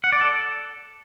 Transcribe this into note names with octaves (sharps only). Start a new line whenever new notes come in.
F#5
D5
A4